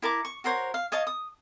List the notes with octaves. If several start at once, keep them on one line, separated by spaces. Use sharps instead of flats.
E4 A#4 A5 D6
C#6
F#4 A#4 C5 C#5
F5
C#5 D#5 F5 A5
D#6